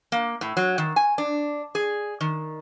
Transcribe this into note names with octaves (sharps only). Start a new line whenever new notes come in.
A#3
A2
F#3
D#3
G#5
D4
G#4
D#3